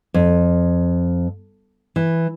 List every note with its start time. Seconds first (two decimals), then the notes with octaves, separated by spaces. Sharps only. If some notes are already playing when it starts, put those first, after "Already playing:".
0.14 F2
1.96 E3